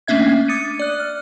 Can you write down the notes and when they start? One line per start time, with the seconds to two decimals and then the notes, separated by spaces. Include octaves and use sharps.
0.08 A3 A#3 C#4 D4 E5 G#6
0.48 D6 D#6 A6 C#7 D#7
0.79 D5 F#6
1.00 F6